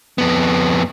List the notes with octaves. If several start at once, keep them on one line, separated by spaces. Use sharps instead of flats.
F2 B3